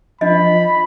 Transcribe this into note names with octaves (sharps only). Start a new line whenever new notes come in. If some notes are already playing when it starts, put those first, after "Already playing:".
F3 D4 D#5 B5